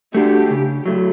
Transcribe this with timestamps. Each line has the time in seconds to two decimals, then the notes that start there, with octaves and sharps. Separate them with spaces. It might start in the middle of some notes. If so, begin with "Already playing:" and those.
0.15 A3 D4 F#4 G4
0.51 C#3
0.86 F#3 A3